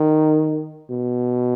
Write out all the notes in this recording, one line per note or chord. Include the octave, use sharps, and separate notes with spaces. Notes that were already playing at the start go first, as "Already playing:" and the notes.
Already playing: D#3
B2